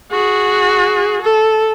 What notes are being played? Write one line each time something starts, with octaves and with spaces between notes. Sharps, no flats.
F#4 G#4
A4